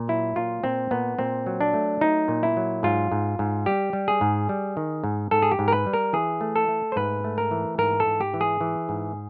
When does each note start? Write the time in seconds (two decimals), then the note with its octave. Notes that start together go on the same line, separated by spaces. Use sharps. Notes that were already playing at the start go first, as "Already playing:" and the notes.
Already playing: A#2
0.08 F#3 E4
0.36 A#2 F4
0.64 A#2 C4
0.91 A#2 B3
1.19 A#2 C4
1.46 F#3
1.61 D4
1.74 A3
2.01 F#3 D#4
2.28 A#2
2.43 E4
2.57 F#3
2.83 G#2 F4
3.12 G#2
3.39 G#2
3.66 G3 G4
3.93 G3
4.08 G#4
4.21 G#2
4.49 G3
4.77 D#3
5.04 G#2
5.31 G#2 A4
5.42 G#4
5.52 G4
5.59 G#2
5.68 A#4
5.72 B4
5.87 G3
5.93 A#4
6.13 E3 G#4
6.41 A3
6.56 A4
6.68 A3
6.92 C5
6.96 G#2 B4
7.24 A3
7.38 A#4
7.51 E3
7.78 G#2 A#4
8.00 A4
8.06 G#2
8.21 G4
8.34 E3
8.41 G#4
8.61 E3
8.89 G#2